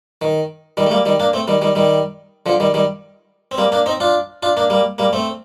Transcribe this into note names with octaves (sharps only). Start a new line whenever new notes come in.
D#3
D#3 G3
A3
G3 A#3
D#3 G3
A#3 D4
A3 C4
D#3 G3
D#3 G3
D#3 G3
D3 F3
D#3 G3
D#3 G3
C4
G3 A#3
A#3 D4
C4 D#4
D4 F4
D4 F4
A#3 D4
G3 A#3
G3 A#3
A3 C4